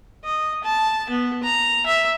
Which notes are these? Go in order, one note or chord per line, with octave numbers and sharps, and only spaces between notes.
D#5
A5
B3
A#5
E5